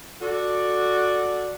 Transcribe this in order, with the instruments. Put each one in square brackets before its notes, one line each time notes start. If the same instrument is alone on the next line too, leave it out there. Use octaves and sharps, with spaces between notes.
[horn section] F#4 A4 D5